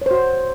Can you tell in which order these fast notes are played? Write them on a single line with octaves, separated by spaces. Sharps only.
C#5 C5 F#4